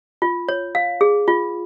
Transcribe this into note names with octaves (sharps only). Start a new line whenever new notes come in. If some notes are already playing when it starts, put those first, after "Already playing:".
F4
C#5
F5
G#4
F4